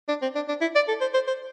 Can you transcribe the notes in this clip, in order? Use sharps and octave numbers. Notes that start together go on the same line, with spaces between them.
D4
C4
D4
D4
E4
D5
A4
C5
C5
C5